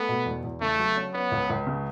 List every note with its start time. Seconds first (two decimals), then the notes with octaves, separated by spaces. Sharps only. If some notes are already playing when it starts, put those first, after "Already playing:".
Already playing: A3 B3
0.09 B2
0.26 E2
0.43 E2
0.61 C#3 A3
0.79 F#3
0.97 C#4
1.13 B3 C#4
1.32 C#2
1.50 C#2
1.67 C#3